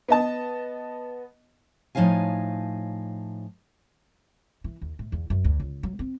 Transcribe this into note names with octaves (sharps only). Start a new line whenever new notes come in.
B3 D#5 A5
A2 F3 D#4 C#5 F5 G#5
E3
D#2
A2
E2
F#2
D2
C#2
F#3
C4